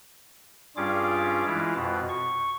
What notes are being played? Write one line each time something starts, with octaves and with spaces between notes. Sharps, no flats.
G2 G3 C#4 F4 G#4 D6
E3 G#3 E4 F4
F2 B2
C#6